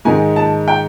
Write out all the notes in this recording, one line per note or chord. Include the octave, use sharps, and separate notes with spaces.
G#2 D#3 G#3 G#5
A5
G5